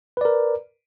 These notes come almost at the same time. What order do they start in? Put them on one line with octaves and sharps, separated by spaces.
B4 D5 A#4